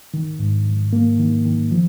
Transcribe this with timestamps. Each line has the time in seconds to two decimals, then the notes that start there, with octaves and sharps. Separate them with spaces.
0.14 D#3
0.40 G#2
0.67 G#2
0.93 A#3
1.19 D#3
1.46 D#3
1.71 F3